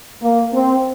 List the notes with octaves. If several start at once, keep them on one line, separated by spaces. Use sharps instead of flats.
A#3
C4